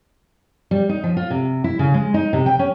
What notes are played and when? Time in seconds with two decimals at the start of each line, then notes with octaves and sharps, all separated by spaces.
0.71 G3
0.89 D#4
1.04 F3
1.17 F4
1.30 C3
1.64 E4
1.79 C#3
1.94 G#3
2.14 D#4
2.33 C3
2.46 G5
2.59 C#4